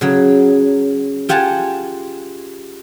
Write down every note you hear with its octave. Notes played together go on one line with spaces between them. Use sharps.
C#3 F#3
F4 G4 F#5 G#5 A5